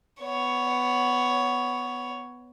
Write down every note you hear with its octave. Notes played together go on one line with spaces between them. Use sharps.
B3 C#5